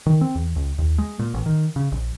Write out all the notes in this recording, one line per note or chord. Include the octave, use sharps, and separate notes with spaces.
D#3
C4
E2
C#2
D#2
G#3
A#2
A1
D#3
C#3
A#1